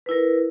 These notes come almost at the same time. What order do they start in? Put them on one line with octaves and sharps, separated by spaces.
B4 E4 A#4